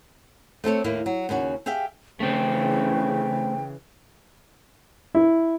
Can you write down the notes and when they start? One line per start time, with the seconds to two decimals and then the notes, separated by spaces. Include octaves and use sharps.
0.64 A3 C4 A4 C#5
0.84 D#2 A2 A#3 E4 F5
1.06 F#3
1.29 D#2 C#3 C#4 F#4
1.66 G4 G#4 E5 F5 G5
2.20 C#3 E3 A3 C4 G5
5.15 E4